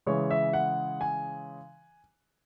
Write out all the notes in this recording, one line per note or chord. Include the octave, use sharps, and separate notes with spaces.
C#3 E3 G#3 C#5
E5
F#5
G#5